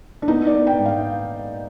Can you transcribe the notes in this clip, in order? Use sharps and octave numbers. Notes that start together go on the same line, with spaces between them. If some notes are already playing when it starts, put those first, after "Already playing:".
D4
B3 D#4
D5
B3
G5
G#2
F5